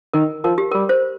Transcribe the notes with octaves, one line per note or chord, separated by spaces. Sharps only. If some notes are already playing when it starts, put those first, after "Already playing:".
D#3 A#4
F3 A#4
G4
G3 A#4
C5